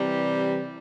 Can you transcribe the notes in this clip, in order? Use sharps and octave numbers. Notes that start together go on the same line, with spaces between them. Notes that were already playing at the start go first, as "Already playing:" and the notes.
Already playing: C3 E3 G3